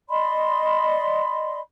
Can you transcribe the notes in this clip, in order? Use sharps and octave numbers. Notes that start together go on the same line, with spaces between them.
D5 D#5 B5 C6